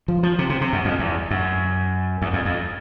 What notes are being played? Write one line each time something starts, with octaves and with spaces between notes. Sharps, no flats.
F3
F3
C3
C3
C3
F#2
F2
E2
F#2
E2
F2
F2